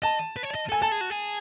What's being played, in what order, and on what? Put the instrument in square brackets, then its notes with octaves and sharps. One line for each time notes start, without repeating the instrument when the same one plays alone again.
[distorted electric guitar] D#5 [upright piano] A5
[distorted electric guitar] B4
C#5
D#5
A4
[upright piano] G#5
[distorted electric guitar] A4 [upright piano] A5
[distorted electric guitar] G#4
F#4
G#4